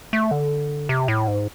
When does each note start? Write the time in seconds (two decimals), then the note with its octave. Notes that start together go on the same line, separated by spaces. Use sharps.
0.13 A3
0.31 D3
0.89 C3
1.08 A2
1.28 G#2